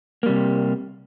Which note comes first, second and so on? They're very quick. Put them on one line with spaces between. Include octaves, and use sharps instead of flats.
A#3 G3 C3